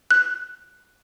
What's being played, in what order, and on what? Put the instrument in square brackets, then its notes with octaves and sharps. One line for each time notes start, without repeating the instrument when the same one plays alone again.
[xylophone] F#6